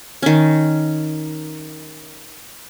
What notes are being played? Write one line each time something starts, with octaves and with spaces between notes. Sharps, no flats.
D#3 C#4